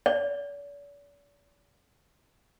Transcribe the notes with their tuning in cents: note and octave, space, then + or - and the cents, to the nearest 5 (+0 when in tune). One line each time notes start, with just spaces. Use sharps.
D5 -45